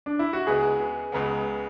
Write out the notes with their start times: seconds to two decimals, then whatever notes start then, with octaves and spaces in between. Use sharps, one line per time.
0.06 D4
0.19 E4
0.33 F#4
0.47 C#2 C#3 G#3 B3 G#4
1.12 C#2 C#3 G#3 B3